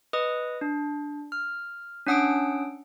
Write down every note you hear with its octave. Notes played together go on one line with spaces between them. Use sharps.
B4 D#5 D#6
D4
F6
C#4 D4 F#5 D#6 E6 D7